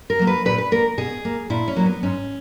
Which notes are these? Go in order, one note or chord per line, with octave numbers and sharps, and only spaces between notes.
A#4
F#3 A#3
B4
A#2 B4
B4
A#3 A#4
B2 G#4
A#3
A#2 E4
C#4
F#3 A#3
B3
G#2 C#4